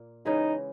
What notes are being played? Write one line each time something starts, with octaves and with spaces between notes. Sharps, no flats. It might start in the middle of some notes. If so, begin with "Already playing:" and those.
Already playing: A#2 A#3
C#3 E3 G#3 D#4